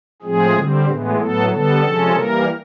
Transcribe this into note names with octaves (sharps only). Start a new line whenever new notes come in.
A2 F3 G#3 C4 G#4
D3 G3 C4
A2 E3 G#3 B3
A2 F#3 B3 A4
D3 G3 B3 A4
C3 F3 G#3 C#4
E3 G3 A#3 A#4